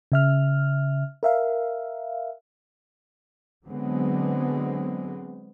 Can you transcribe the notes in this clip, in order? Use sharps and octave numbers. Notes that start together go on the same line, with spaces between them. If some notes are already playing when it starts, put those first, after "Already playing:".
C#3 E5 F6
A#4 E5 F5
D3 F#3 G#3 B3 C4